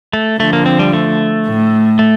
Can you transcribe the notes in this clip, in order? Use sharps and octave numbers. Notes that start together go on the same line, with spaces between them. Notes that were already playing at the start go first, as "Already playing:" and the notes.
A3
D3 F3 A3
A#3
C4
G3
A3
A2
A3